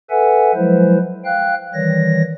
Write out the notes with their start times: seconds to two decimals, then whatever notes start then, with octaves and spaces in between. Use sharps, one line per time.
0.10 A4 B4 E5 F#5 G#5
0.55 F3 F#3 G#3 E4 B4 C5
1.25 F5 G5 F#6
1.74 D#3 E3 G3 C#5 A#6